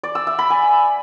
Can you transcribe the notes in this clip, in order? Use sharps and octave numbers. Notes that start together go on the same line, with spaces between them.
D5
E6
E5
B5
G#5